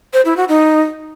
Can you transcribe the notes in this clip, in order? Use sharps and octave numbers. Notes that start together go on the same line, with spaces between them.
C5
E4
F#4
D#4